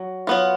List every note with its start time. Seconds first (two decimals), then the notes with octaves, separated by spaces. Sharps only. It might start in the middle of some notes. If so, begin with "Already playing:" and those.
Already playing: F#3
0.27 F#3 B3 F4